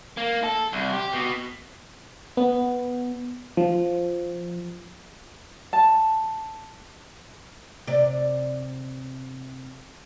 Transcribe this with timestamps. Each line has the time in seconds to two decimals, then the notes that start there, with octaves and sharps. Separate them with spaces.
0.17 A#3
0.44 A4
0.73 C2
0.93 G4
1.13 B2
2.37 B3
3.57 F3
5.73 A5
7.87 C3 D5